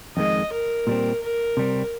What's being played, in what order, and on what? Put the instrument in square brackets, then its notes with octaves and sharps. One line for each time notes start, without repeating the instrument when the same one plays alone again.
[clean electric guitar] F2 D#3 G#3 [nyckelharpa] D#5
[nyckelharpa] A#4
[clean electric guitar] A#2 G3 C4
[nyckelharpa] A#4
[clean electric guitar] C3 G3 C4